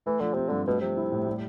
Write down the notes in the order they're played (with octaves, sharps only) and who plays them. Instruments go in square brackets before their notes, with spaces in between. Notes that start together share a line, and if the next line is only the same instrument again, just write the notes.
[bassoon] E3 [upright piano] A3
[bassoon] D3 [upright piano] F3
[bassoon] C3 [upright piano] C4
[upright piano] G2 [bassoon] D3
[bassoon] B2 [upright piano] A3
[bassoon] C3 [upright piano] F3
[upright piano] E4
A2
G3